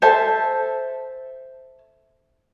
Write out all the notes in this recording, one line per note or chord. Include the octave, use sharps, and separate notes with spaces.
A4 C5 E5 A5